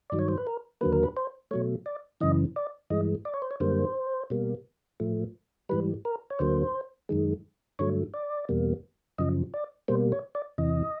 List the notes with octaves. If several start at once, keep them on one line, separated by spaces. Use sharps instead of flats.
G2 D#3 F#3 D5
C#5
C5
B4
A#4
D#2 D3 F#3 A#3 B4
A#4
B4
C5
B2 F#3 A3 C#5
D5
F#2 C#3 E3 D#5
D5
G2 E3 G#3 D#5
D5
C#5
C5
C#5
F#2 D3 G3 A#3 C5
B2 G3 A#3
A2 F3 A3
G#2 E3 G3 B4
A#4
C#5
D2 D3 F#3 A#3 C5
F#2 D#3 G#3
G2 D3 F#3 A3 C#5
D5
E2 B2 G3 A#3
F#2 C#3 F3 D#5
D5
B2 G3 A#3 C5
C#5
D5
E2 C3 E3 D#5